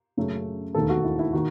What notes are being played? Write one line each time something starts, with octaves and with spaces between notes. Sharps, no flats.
F#2 C#3 F#3 A3
E1 D#2 D#3 A3 A4
F#4
E4
E4
D#3 F#4